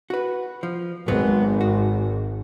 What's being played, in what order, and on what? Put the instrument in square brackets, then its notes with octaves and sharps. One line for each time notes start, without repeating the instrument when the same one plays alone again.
[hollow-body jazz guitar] F#4 B4
F3
[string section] G#1 [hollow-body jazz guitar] F#3 B3 C4
[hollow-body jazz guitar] F#4